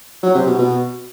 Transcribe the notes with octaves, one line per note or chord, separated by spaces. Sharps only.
F#3
C3
B2
B2